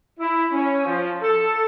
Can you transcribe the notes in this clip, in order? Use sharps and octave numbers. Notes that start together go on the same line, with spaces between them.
E4
C#4
F3
A4